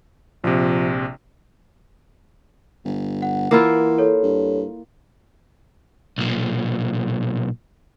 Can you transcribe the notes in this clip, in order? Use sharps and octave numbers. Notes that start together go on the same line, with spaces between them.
A#1 C3 F3
G1
F#5
E3 A#3 E4 F4
A4 C#5
G2
B1 A#2